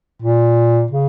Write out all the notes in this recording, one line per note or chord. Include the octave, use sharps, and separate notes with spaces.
A#2
C#3